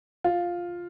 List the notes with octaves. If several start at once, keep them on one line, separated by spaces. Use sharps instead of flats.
F4